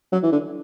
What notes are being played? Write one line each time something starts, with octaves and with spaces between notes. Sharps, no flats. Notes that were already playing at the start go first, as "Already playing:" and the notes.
F#3
E3
D3